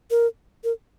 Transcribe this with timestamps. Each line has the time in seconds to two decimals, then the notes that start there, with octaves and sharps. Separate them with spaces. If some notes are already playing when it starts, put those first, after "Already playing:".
0.11 A#4
0.64 A#4